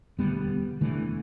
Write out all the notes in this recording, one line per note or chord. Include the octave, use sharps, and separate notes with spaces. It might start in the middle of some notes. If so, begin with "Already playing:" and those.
E1 D2 D3 G3 B3
E1 E2 D3 E3 A3